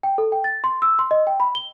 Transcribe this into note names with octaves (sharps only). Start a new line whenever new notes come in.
G5
A4
G5
A6
C6
E6
C6
D#5
G5
B5
G7